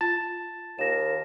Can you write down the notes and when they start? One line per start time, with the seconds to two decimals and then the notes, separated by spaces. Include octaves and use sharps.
0.01 F4 A5
0.79 D#2 A#4 A#6 E7